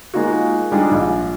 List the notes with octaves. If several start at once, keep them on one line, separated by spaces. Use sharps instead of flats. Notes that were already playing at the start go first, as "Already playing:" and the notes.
G#3 A#3 D#4 F4 F#4
G3 G#3 D4 D#4 F4
A#1